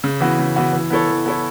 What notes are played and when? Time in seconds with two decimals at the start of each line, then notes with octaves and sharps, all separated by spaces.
0.04 C#3
0.20 E3 B3 F#4
0.39 C#3
0.56 E3 B3 F#4
0.73 E3
0.91 B3 E4 A4 C#5
1.08 E3
1.26 B3 E4 A4 C#5